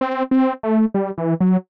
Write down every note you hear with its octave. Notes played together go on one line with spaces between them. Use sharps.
C4
C4
A3
G3
E3
F#3